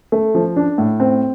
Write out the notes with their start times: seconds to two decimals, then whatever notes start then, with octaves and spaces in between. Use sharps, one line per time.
0.12 A3
0.35 F3
0.56 D4
0.78 A2
1.00 C4